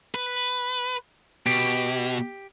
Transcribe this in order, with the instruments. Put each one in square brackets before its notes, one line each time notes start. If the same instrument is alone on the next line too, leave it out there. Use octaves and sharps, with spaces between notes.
[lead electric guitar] B4
[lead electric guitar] B2 [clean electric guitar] G4